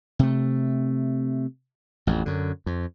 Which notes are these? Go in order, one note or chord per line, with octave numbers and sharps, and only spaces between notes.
C3 A3
A1 F2
F#2 D3
F2